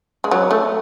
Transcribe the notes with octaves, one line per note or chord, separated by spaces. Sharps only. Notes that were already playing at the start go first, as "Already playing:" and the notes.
G#3
F#3
A3